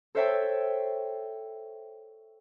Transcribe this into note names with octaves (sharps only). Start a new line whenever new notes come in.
A4 C5 C#5 E5 G5 A5